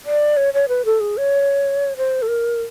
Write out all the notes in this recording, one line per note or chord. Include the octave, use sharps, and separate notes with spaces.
D5
C#5
C#5
B4
A4
G#4
C#5
C5
A4
A#4